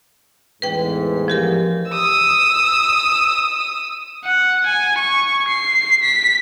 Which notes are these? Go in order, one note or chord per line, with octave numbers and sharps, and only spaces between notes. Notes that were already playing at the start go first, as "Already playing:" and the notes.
A1 E2 G#2 B4 G5
F3 G4 A#4
D#6 E6
F#5
G#5
C#6
C7
B6